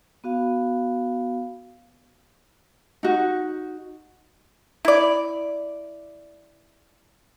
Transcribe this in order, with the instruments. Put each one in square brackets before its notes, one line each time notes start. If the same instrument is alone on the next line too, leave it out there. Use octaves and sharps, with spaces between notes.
[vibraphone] B3 F#4 F5
[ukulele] D#4 F#4
[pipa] E4 D5